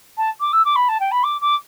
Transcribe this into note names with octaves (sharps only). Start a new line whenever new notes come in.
A5
D6
E6
D6
B5
A5
G5
B5
D6
D6